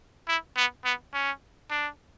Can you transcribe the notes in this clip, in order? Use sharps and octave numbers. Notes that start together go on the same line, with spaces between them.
E4
B3
B3
C#4
D4